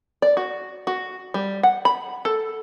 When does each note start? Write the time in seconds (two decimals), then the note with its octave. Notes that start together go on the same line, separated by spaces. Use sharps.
0.22 D5
0.37 F#4
0.87 F#4
1.34 G3
1.63 F#5
1.85 B5
2.25 A4